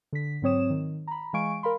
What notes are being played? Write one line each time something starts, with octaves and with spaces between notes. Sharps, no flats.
D3 B6
G#2 F#3 C4 C#5 D#6 E7
D#3
A#5 B5
E3 G#3 F5 G#5 C#6 D7
A#4 F5 B5 C6